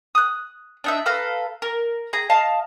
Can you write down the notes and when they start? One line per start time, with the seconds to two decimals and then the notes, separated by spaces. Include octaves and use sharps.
0.15 D#6 F#6
0.84 D4 D#4 E5
1.06 A4 B4 F5 A#5
1.62 A#4
2.13 G#4 A#5
2.30 D#5 F5 A5